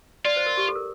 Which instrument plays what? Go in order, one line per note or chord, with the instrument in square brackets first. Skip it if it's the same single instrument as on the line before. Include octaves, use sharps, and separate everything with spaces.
[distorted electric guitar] F4 [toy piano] D5
[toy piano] C5
A#4
G4
A4
A#4